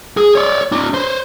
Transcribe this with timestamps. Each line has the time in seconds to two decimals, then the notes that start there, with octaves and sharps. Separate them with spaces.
0.17 G#4
0.35 C#5 D5
0.72 D4 E4
0.94 B4 C5